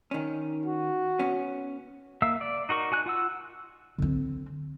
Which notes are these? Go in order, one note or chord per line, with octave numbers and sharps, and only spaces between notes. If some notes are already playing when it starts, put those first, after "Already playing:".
D#3 C#4
F#4
B3 C#4
A#3 E5 F5 E6
D5
D#4 F#4 A#4 C#6
F#4 G#5 F#6
F4 F#5 E6
D3 C4